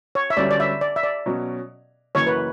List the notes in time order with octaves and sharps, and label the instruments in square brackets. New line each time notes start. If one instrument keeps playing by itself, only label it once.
[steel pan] C#5
E5
[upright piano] G1 G2 F#3 C#4 [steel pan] D5
[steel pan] D5
E5
D5
E5
D5
[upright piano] B2 F#3 C#4
[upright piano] F#1 F#2 E3 A#3 [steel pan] C#5
[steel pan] B4